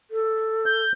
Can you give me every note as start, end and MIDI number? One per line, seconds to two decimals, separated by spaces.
0.11 0.84 69
0.66 0.92 91